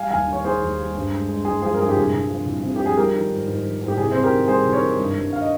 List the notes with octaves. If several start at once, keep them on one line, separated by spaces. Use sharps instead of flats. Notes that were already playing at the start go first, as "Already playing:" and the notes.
Already playing: G3 F5 G#5
D#2 F5 G#5
D#3
C#5
D#3 G#4 C5
D#2
G3
G2
G#3
G#3
G#3 G#4
F3 G#4
A#4
G2 G#4
G4
C2 G#4
C2
F3
C2
C3
F3 G4
G#4
G3 G4 A#4
D#3
G#2
G#2
D#3
G#2
G4
C2 G#4
C3 C5
G4 A#4
D#3
G3 G#4 C5
C2
A#4 C#5
D#3
G2
G2
F5
D#5